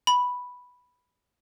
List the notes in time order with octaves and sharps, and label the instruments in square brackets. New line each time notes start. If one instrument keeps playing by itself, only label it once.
[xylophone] B5